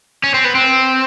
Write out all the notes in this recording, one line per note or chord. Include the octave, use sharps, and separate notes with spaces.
C#4
C4
B3
C4